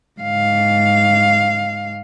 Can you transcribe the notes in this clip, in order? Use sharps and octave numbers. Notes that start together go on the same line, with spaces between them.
G#2 F5